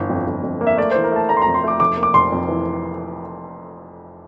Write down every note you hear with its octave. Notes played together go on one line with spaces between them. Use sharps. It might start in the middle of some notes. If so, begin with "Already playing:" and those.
Already playing: G1 E3
F2
G1
F2
A#3
E5
A3 D5
E3 C5
A#4
A3 A5
A3 A#5
C6
F2 A#5
C6
A3 D6
F1 D6
A#3
D6
F1 C6
F2
E3